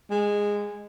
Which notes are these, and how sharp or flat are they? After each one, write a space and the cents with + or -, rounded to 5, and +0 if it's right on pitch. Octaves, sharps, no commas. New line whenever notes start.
G#3 -15